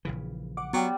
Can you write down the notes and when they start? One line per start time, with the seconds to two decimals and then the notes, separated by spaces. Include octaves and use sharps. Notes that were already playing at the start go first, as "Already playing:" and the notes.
0.05 A#1 C#3 E3
0.57 F#5 D6
0.73 F#3 G3 B3 G4 C#5